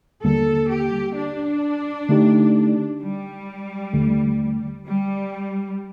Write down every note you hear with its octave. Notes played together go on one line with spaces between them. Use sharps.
D#2 D3 G3 A#3 A4
G4
D4
D3 A3 D#4 G4
G3
D#2 D3 A3
G3